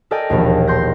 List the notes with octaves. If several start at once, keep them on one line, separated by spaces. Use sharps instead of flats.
A4 A#4 D5 D#5 G5 G#5
E1 A#1 D#2
C6 G6 A#6